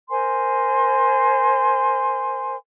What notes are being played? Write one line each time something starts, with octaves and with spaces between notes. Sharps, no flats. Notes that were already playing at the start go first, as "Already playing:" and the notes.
A#4 C5 G#5 C6